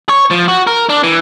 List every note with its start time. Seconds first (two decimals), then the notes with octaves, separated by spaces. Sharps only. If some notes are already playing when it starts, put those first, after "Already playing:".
0.09 C#5
0.30 F3
0.48 F#4
0.67 A#4
0.89 D4
1.03 E3